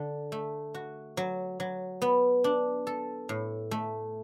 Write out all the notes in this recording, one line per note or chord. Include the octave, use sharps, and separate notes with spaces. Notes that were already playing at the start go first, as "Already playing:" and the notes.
Already playing: D3
A3
F#4
F#3
F#3
B3
D4
A4
A2
A3